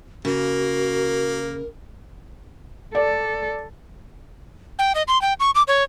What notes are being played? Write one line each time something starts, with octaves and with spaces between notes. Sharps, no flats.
C#3 A#3 F#4 A#4
A4 D5
G5
D#5
C6
G5
C#6
D6
C#5